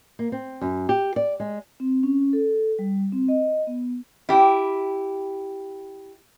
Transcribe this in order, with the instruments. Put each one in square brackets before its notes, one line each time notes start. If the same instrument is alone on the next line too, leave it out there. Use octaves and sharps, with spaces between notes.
[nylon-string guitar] A#3
C4
F#2
G4
D5
G#3
[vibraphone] C4
C#4
A4
G3
C4
D#5
B3
[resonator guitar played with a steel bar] E4 G4